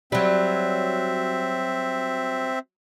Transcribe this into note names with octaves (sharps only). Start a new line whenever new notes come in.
F#3 G3 C4 E5